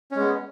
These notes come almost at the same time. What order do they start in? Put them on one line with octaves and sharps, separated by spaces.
C#4 G#3 B3